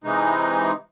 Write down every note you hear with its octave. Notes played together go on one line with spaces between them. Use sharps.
C3 E3 G#3 D#4